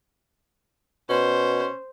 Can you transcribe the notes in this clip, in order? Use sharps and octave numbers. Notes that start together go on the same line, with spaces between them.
B2 C#4 C5